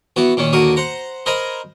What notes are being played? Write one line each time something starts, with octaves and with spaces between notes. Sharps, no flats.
E3 B3 F#4
A#2 D#3 C#4
D#2 D3 F#4 A#4 D#6
C5 F#5 A#5
A#4 C5 D#5 G#5 A#5 B5